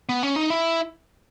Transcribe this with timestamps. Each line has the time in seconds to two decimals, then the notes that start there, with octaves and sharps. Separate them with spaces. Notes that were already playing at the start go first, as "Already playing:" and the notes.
0.09 B3
0.23 C#4
0.36 D#4
0.50 E4